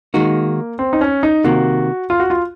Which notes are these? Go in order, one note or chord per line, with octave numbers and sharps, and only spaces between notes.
D#3 G#3 A#3 D#4 F#4
C4
D#4
C#4
D#4
C3 D#3 A#3 F#4
F4
F#4
F4